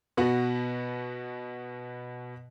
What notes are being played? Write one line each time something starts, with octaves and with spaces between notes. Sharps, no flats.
B2 B3 F#4